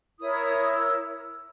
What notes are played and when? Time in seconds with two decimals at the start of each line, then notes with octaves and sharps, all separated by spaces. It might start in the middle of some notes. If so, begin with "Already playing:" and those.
0.20 E4 A#4 C#5 D#6
0.73 E6